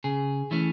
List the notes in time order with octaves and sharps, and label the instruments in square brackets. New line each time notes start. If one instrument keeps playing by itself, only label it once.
[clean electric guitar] C#3 G#4
E3 A3 C#4